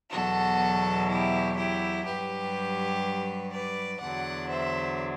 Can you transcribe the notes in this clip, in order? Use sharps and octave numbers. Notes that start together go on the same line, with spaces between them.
E2 B2 F#3 F#4 A4
E4 G4
E4 G4
G2 F#3 G4 B4
B4 D5
E2 D3 F#3 D5 F#5
C5 E5